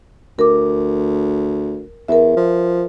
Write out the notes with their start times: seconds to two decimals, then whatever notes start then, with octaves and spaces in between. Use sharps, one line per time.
0.39 D2 A#4 D6
2.08 E2 A#4 E5
2.37 F3